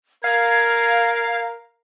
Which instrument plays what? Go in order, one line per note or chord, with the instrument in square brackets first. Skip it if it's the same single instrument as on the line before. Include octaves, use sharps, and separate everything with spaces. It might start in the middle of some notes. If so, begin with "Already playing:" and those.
[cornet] A#4 [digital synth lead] F5 [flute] G#6